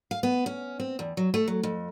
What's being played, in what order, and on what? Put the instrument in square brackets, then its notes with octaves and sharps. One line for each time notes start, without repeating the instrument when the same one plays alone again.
[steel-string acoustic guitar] F5
B3
C#4
C4
E2
F#3
A3
F#3
F2